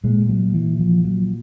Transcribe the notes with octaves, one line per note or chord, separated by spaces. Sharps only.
A#2 G#3
F#3
E3
F3
F#3